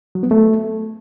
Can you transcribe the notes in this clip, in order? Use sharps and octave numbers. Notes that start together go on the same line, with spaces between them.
F#3
B3
A3